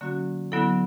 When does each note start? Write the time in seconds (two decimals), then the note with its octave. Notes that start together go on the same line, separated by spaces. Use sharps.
0.01 D3 F#3 A#3 C#4 F#4
0.52 D3 F#3 B3 E4 A4